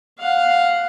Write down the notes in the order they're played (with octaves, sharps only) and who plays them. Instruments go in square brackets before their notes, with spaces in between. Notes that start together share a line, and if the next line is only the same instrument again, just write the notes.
[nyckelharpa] F5 F#5